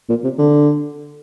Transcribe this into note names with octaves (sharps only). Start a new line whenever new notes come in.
A#2
C3
D3